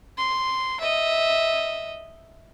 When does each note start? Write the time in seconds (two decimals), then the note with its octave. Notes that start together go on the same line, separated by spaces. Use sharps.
0.17 C6
0.80 D#5 E5